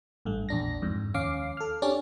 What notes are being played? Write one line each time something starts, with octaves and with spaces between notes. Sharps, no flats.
A1 G2 A3
A#1 E2 D4 A#6
F2 G#2
D#2 C#4 F5 D6 C7
A4 F6
C#4 D4 G4 D5